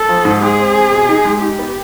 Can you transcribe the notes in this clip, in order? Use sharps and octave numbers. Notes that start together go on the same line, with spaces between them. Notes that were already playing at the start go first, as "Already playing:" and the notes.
Already playing: A4
F3
G#2
G#3 G#4
C4
C4
B2
D#4
G#3
D#4 G4
B3